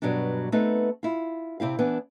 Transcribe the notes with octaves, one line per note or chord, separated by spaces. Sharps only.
G2 B2 F#3 G3 D4
A3 B3 C4 D#4 B4 C5
E4 F4
C3 C4 E4 F5
E3 B3 D4